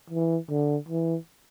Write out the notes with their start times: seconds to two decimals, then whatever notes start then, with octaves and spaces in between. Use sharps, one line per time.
0.10 E3
0.49 D3
0.89 E3